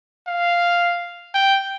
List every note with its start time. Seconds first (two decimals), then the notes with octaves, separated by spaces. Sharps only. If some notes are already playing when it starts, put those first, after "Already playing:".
0.27 F5
1.34 G5